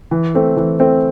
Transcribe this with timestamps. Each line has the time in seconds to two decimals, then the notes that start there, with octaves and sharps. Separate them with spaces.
0.11 E3
0.35 A3 C4
0.56 E3
0.79 A3 C4